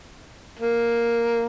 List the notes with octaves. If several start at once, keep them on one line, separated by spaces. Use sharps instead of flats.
A#3